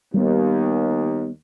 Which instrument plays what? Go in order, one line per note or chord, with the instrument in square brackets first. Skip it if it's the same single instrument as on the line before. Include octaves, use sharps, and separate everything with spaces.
[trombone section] D#2 [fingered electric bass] G3 B3